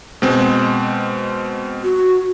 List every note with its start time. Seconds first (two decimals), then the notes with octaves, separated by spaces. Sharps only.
0.22 B2 G#3 C4
1.84 F#4